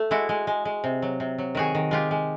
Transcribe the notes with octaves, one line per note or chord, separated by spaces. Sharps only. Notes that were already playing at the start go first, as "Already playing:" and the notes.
Already playing: A3
G#3 E4 F#4
G#3
G#3
G#3
C3
F#3
C3
F#3
D#3 F#4 G#4
D#3
G#3 F4 G4
G#3